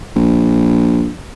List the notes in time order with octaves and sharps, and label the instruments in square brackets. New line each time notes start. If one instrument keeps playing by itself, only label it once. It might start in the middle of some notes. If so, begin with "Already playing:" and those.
[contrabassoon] A#1